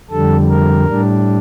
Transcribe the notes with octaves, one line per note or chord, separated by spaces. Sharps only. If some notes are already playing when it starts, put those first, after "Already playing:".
F2 D3 G3 A4
A#4
A2 G3 D4